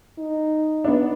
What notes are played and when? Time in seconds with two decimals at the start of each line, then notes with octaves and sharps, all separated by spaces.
0.18 D#4
0.84 B3 D4